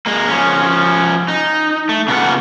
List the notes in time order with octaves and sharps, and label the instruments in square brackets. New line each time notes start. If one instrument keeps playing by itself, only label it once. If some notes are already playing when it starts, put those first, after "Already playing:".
[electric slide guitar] G#3 A#3
F3 C#4
D#4
A3
C#3 A#3 B3 F4 F#5